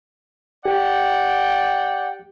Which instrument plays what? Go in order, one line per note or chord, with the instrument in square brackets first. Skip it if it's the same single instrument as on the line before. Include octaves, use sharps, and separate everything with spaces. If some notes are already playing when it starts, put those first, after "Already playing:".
[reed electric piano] G4 [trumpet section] D5 F#5 G5